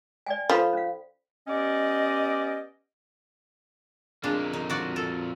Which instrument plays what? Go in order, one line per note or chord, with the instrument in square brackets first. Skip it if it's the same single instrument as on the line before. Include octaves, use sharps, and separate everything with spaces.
[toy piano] D5 G5 G#5
[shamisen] F3 [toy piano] A4 F5 B5
[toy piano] C#4 F5
[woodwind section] B3 C#4 G4 D5 D#5
[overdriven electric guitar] F2 A#3 [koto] G#3 D4
[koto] D#4
F#4 D5
A4